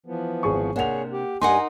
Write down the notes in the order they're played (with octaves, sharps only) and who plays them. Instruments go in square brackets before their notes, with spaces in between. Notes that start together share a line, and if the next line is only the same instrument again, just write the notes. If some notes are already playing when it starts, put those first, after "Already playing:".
[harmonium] E3 F3 B3
[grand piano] G#1 G#4 C#6
[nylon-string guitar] C3 D4 [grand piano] A#3 F#5 F7 [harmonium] G#4 C#5
[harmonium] G4
[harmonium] G2 [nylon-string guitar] D#4 A#4 F#5 [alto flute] G#5 [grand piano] C6